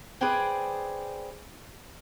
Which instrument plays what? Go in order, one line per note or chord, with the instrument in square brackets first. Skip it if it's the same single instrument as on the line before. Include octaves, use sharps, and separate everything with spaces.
[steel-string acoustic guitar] G#4 B4 C5 D5 G5 G#5